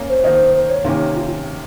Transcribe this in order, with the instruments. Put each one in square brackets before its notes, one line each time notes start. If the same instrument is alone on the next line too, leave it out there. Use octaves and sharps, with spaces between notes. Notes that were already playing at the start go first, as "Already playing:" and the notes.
Already playing: [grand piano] A#3 C#4
[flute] C5
[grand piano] D#3 A#3 D#4 [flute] C5
[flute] C5
C#5
[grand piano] C3 D#3 A#3 C#4
[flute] F4